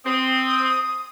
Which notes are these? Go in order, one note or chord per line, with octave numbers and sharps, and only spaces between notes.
C4 D#6